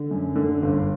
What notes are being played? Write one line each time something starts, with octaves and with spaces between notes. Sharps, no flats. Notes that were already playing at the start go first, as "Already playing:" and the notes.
Already playing: D3
F#2
D3
G1